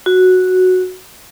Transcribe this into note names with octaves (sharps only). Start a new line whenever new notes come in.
F#4